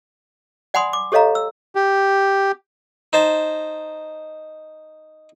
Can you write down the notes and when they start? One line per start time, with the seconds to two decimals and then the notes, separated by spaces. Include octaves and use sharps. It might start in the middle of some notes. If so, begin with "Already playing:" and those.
0.74 D5 F#5 G#5 B5 C6 D#6
0.93 D6
1.12 G4 A4 C#5 D#5 F5 A#5
1.35 E6
1.75 G4
3.13 D#4 C5 A5